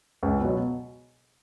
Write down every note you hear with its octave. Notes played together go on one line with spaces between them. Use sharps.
C#2
B2 F#3